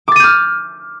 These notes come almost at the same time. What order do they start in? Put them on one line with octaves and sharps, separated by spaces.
D6 A6 D#7 G6 F6